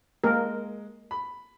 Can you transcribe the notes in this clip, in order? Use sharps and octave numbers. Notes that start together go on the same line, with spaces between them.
G#3 A#3 A#4
B5